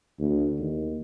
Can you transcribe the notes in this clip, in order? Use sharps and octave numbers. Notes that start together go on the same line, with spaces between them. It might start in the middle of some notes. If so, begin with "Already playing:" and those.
D2
D#2